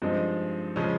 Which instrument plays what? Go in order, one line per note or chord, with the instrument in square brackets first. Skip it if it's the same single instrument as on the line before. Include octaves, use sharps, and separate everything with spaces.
[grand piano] G2 F3 G#3 C4 D#4
C#3 F3 G#3 C#4